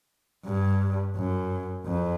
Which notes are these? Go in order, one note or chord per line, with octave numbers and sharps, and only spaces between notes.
G2
F#2
F2